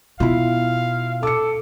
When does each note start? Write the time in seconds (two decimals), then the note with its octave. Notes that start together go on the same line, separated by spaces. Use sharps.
0.20 B2 E4 F4 F5
1.23 A4 D6 C#7